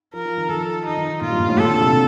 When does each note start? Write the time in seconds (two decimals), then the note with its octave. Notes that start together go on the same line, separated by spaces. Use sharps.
0.13 F3 A#4
0.25 F3
0.38 D#3
0.49 D#3 A4
0.86 D#4
0.91 F3
0.97 D#3
1.21 A#2 F4
1.30 G2
1.40 A#2
1.49 A2
1.57 A#2 A4
1.70 D3
1.82 C3